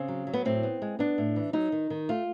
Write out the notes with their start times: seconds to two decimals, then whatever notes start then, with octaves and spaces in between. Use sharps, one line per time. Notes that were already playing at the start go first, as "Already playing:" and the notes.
Already playing: C#3 C4
0.08 F#3
0.27 F#3
0.33 B3
0.45 A2 C4
0.63 B3
0.82 G#3
0.99 B3 D4
1.18 A2
1.36 E3
1.53 F#3 D#4
1.72 D#3
1.90 D#3
2.09 A3 F4